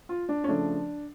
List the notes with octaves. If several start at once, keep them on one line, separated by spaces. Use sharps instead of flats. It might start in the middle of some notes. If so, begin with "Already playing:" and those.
F4
D4
C#4
C#3 F3 A3 D4